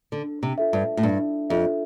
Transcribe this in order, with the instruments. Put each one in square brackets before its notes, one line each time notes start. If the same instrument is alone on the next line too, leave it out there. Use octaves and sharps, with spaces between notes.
[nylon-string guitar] D3 [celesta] D4
[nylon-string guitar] C3
[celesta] F4 A4 E5
[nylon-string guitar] G2
A2
[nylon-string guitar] G2 [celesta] D4
[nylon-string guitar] F2 [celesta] F4 A4 E5